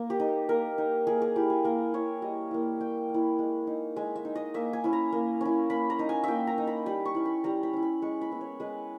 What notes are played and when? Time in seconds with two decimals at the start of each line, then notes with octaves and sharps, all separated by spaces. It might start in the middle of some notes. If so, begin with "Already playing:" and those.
Already playing: A#3
0.10 G4
0.20 D#4
0.49 A#3 A#4
0.78 D#4
1.07 A#3 G#4
1.22 G#4
1.36 E4 G4
1.50 G#4
1.64 A#3 A#4
1.94 E4 C#5
2.22 G3 D#5
2.51 A#3 E4
2.80 G3 G5
3.09 A#3 E4
3.39 G#3
3.67 D#4
3.96 G#3 E5
4.16 E5
4.25 D#4
4.35 D#5
4.54 A#3 E5
4.73 G#5
4.84 C#4 E4
4.93 A#5
5.12 A#3
5.41 C#4 E4
5.70 A#3 B5
5.90 A#5
5.99 D#4
6.09 G#5
6.24 A#3 E5 G5
6.47 A#5
6.58 D#4
6.67 B5
6.86 G3 B5
7.05 C#6
7.15 C#4 E4
7.25 B5
7.44 G3 A#5
7.63 B5
7.73 C#4 E4
7.83 B5
8.02 G#3 C#6
8.21 B5
8.31 B3 E4
8.41 C#5
8.60 G#3 B4